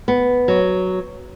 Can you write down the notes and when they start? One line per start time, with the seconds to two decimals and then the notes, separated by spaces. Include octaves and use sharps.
0.08 B3
0.48 F#3